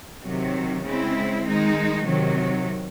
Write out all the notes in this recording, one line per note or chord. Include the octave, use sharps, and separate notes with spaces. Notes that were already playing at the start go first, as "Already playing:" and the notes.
C3 D#3 F#3
C#3 G#3 C4 E4
D#3 G#3 D#4
C3 D#3 F#3